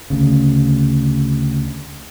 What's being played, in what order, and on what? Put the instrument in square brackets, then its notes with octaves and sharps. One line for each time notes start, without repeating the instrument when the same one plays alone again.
[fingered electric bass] D2 C#3